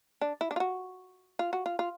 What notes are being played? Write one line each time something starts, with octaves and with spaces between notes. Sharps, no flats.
D4
E4
D4
F4
F#4
F4
F#4
F4
F4